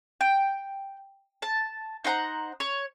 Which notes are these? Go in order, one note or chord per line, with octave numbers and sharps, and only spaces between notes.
G5
A5
D#4 C5 F#5 A#5
C#5